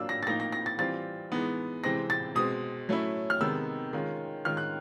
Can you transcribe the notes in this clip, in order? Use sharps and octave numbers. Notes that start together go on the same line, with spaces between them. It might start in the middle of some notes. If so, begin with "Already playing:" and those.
Already playing: F#3 A#3 D4 F4 E6
A#6
A6
A2 F3 A#3 D#4 A#6
A#6
A#6
A6
E3 G3 C4 F4 A6
E3 G#3 B3 D#4
C3 E3 G#3 C4 A#6
A6
B2 G#3 C4 D#6
F#3 A3 C#4 E4
F6
C3 D#3 G#3 B3 E6
D#3 G#3 C#4 F4
D#3 G#3 C#4 F4 F6
F#6